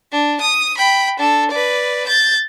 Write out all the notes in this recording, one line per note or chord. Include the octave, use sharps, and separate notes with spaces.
D4
D#6
G5 B5
D4 A4
B4 D5
G6 A6